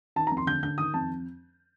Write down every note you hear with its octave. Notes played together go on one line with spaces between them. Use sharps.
D#3 A5
A#5
F2
C6
D3 G6
D3 G6
D#3 D#6
F2 A5